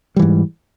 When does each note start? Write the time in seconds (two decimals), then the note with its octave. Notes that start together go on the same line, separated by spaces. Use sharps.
0.16 G3
0.19 E3
0.22 G#2